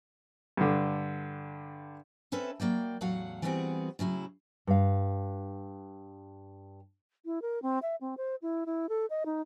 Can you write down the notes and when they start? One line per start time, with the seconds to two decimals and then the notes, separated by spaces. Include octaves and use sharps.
0.57 G2 D3
2.32 C4 C#4 A4 B4 E5
2.60 F#3 A#3 D5 G5
3.01 E2 A2 F#3 F#4 F5 F#5
3.42 E3 G3 B3 C4 F#4 G#4
3.99 A2 C#3 F#3 E4
4.67 G2 F5
7.25 E4
7.42 A#4
7.62 C4
7.82 E5
8.01 C4
8.17 C5
8.42 E4
8.66 E4
8.89 A4
9.10 D#5
9.25 D#4